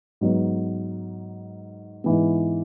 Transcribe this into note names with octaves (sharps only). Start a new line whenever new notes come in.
G#2 F#3 B3
G#2 E3 B3